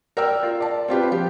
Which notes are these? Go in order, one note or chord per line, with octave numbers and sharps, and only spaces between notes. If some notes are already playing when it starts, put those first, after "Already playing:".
A#4 D5 G5 E6
F4
D5 A5
C4 F4 G4 B4
F3 G4